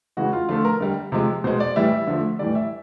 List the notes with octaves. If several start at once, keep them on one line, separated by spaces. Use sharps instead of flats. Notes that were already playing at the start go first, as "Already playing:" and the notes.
C#3 E3 G#3 F#4
F4
D3 F3 A3 F4
A#4
D3 G3
C3 F3 G#3
B2 G#3 C5
D5
A2 E3 G3 E5
D3 F3 A3
A2 E3 G3 D5
E5